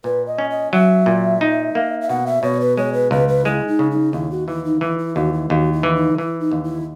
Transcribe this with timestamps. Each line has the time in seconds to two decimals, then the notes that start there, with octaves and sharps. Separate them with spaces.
0.04 A#2 B4
0.26 D#5
0.38 C#4
0.50 D#5
0.72 F#3 E5
1.06 A#2
1.41 D#4
1.75 A#3
2.01 E5
2.09 B2 F#5
2.27 E5
2.43 B2 C#5
2.61 B4
2.77 G#3 C#5
2.93 B4
3.11 C#2 B4
3.28 B4
3.45 G#3 E4
3.68 D#4
3.79 C#3
3.91 D#4
4.13 D#2 E4
4.31 F#4
4.48 E3 E4
4.65 D#4
4.81 E3 E4
4.99 E4
5.15 D#2 F#4
5.33 E4
5.49 D#2 F#4 G#4
5.73 E4
5.83 E3
5.95 D#4
6.18 E3 E4
6.40 D#4
6.52 D#2
6.64 E4